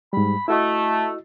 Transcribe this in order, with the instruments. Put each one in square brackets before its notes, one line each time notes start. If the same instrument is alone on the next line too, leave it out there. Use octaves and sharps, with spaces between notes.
[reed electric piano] G#2 G3 [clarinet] B5
[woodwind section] A3 [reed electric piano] E4 F#4 D#5 [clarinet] E6